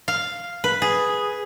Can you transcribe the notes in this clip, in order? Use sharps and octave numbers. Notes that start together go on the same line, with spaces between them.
F5
B4
G#4